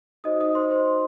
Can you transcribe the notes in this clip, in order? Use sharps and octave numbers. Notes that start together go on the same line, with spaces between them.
D#4 F#4 C5 D#5 D#6
D#5 D#6
C5 C6
C5 C6